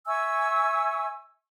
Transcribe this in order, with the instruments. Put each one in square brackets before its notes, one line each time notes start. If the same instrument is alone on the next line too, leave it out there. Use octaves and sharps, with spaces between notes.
[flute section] E5 G#5 C#6 E6